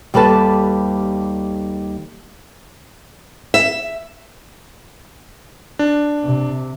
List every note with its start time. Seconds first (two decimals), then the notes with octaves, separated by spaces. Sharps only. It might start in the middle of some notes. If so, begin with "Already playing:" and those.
0.14 D#2 G3 A4 B4 A5
3.54 E5
5.79 D4
6.24 C3